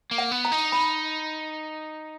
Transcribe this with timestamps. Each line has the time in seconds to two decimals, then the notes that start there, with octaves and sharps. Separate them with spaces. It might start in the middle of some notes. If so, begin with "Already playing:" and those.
0.11 A#3
0.18 F#5
0.32 B3
0.45 A#5
0.52 D#4
0.72 B5